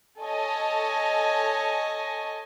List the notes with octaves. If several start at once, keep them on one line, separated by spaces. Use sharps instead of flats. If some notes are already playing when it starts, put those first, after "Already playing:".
A4 C#5 D#5 G#5